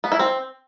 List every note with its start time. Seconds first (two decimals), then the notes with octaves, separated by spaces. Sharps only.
0.04 B3
0.12 E4
0.19 C4